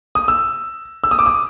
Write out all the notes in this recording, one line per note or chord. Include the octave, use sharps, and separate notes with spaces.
D#6
E6
E6
D#6
D6
D#6